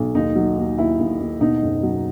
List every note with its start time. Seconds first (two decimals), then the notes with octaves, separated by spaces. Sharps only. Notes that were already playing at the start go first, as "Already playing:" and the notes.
Already playing: B1
0.15 D#2 D#4
0.36 F#3
0.57 D#2
0.78 D#2 E4
0.99 D#2
1.20 D#2
1.41 B2 D#4
1.62 F#1
1.83 F#3